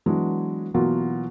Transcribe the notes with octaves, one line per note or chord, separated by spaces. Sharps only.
E3 F#3 G#3 B3 D4
B2 E3 F#3 A#3 F4